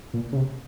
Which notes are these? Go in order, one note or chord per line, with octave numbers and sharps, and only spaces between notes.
A#2
C#3
C3